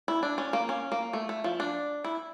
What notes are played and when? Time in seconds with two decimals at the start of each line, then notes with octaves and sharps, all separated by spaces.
0.08 E4
0.23 D4
0.38 C#4
0.53 A#3
0.69 C#4
0.92 A#3
1.13 A3
1.29 A3
1.44 F3
1.60 D4
2.04 E4